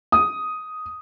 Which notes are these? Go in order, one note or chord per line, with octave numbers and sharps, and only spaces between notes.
D#6